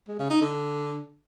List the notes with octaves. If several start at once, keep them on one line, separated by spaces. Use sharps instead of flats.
G#3
C#3
D#4
D3